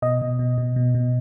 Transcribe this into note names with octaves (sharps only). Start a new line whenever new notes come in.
B2 D#5
B2
B2
B2
B2
B2